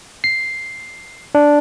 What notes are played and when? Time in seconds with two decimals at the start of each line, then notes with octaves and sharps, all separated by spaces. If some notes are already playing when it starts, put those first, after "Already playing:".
0.24 C7
1.35 D4